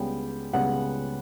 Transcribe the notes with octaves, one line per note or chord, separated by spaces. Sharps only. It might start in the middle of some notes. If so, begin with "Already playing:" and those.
Already playing: C#2 C#3 G3 B3 G5
C#2 C#3 G3 B3 F#5